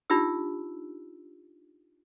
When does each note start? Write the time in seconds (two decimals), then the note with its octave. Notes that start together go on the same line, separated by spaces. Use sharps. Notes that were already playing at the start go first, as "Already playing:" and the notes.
0.10 D4 D#4 F4 G4 E6